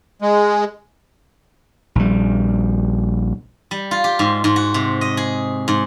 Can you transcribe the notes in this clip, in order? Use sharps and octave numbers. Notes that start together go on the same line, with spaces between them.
G#3
A#1 G3
G3
F4
G4
G#2
G#2
F#4
C3
D#5
G#4
G#2